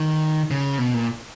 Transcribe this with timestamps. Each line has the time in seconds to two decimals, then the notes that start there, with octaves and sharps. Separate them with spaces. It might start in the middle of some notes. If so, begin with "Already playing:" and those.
Already playing: D#3
0.51 C#3
0.78 B2
0.94 A#2